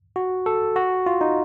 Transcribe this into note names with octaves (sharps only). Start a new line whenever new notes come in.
F#4
A4
F#4
F4
D#4